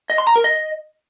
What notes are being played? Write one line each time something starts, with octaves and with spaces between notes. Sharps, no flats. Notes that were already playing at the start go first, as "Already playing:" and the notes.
D#5
C6
A#5
A#4
D#5